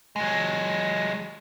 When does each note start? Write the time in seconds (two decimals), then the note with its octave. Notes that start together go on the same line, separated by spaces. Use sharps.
0.16 F#3 G#3